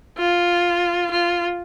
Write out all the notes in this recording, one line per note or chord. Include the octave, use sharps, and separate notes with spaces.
F4
F4